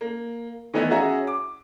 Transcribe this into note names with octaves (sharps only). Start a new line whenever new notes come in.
A#3
D#3 E3 A3 B3 D#4 E4
C#4 F#4 G#4 E5 A#5
D6